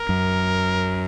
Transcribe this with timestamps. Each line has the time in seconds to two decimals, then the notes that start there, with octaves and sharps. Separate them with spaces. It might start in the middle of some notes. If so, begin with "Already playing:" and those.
Already playing: A#4
0.09 F#2